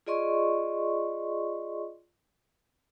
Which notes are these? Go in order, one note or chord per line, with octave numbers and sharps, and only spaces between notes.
F4 G#4 D5 D#5 C6 C#6